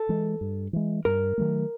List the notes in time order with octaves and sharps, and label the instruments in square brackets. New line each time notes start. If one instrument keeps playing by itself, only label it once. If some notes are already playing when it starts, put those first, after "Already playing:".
Already playing: [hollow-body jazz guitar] A4
[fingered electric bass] E3 G#3
G2
E3 G#3
[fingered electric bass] G2 [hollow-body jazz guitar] A#4
[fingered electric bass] D#3 F#3 A3